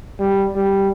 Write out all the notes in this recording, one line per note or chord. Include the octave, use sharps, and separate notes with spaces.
G3
G3